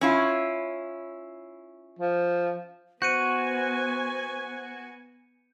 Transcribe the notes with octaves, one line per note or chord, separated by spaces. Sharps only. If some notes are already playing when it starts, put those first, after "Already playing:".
C#4 E4 F4
F3
B3 F#4 C5 G#5 G6 C#7 D#7